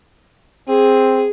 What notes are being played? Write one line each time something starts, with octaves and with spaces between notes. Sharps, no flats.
C4 G#4